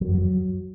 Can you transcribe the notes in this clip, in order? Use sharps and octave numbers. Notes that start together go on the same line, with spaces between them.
F#3
F#2
F#3